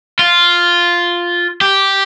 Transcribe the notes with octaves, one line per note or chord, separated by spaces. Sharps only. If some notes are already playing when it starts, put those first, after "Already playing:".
F4
G4